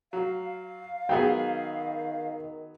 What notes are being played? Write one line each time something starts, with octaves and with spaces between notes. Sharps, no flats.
F#3 F5
D#3 F#3 B3 G#4 G5